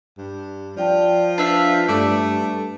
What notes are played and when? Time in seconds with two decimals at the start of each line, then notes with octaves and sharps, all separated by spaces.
0.17 G2
0.77 F3 D5 G5 A5
1.38 D4 B4 E5 F5
1.88 G2 A3 D5